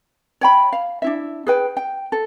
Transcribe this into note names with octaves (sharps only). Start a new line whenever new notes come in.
C#5 G5 B5
F5
D4 E4 E5
G#4 B4 G5
G5
A4